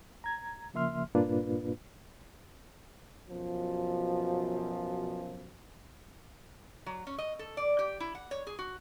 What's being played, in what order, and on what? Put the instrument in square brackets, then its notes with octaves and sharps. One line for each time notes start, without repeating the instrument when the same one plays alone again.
[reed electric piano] A#5 G#6
C#3 F3 A#3 E5 C6 F6
G2 A#2 A#3 D4 F4 B4
[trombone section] F#2 B2 F3
[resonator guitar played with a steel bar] F#3
C#4
D#5
A4
D5
G4
E4
F#5
C#5
G#4
F#4